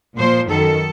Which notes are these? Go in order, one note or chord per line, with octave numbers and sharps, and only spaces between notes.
A#2 F3 C5
F#2 D#3 A4